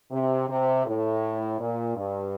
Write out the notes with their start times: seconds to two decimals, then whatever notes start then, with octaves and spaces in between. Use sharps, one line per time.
0.11 C3
0.49 C3
0.86 A2
1.59 A#2
1.96 G2